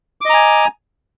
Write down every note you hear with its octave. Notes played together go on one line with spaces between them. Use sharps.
D#5 G#5 A#5 D6